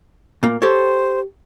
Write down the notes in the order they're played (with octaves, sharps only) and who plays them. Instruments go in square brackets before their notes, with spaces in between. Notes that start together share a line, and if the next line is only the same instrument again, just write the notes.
[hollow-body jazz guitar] A#2 A#3
[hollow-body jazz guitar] G4 A4 C#5 [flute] C5